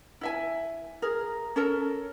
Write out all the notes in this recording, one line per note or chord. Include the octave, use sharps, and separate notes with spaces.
E4 E5 G#5
G#4 A#4
C#4 A4 A#4